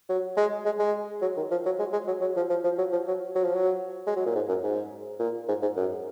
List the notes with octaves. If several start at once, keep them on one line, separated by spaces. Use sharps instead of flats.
F#3
G#3
G#3
G#3
F#3
D#3
F3
F#3
G#3
G#3
F#3
F#3
F3
F3
F3
F#3
F3
F#3
F#3
F3
F#3
G#3
F#3
A#2
G#2
F#2
G#2
A#2
G#2
G#2
F#2